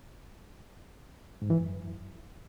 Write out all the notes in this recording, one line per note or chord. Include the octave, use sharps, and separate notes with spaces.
G#2
E3
F#2